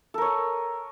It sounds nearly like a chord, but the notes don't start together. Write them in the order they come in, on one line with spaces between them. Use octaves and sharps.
A4 A#4 C#5 G#5